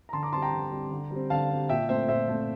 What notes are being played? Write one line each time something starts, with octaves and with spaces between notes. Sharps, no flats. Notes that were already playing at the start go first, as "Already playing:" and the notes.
A#5
D3 A5 C6
A#5 D6
G3 C4 A5 C6
G5 A#5
D3
G3 C4
D3
G3 C4
D3 F5 A5
G3 C4
A#2 E5 G5
A3 C4 C5 E5
A#2 C5 E5
A3 C4